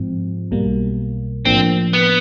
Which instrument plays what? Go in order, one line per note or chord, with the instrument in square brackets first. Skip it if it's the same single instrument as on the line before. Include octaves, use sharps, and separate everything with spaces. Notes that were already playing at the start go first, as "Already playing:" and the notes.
Already playing: [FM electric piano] G#2 F3 G#3 C4
B1 B2 G3 A#3
[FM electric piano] A2 F3 A#3 D4 [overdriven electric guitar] C4
[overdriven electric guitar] B3